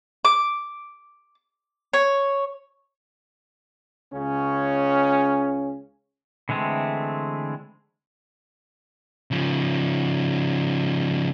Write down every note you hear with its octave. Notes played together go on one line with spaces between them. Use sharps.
D6
C#5
C#2 C#3 C#4
D3 E3 G#3 A3 C4
C#3 F3